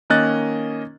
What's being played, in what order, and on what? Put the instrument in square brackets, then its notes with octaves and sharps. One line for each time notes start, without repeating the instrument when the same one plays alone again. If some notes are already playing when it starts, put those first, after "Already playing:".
[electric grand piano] D#3 A#3 C#4 D#5 F#6 A6